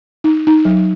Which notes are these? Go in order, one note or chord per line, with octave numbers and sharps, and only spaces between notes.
D#4
D#4
F#3